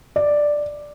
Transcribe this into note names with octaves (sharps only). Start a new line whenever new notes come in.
D5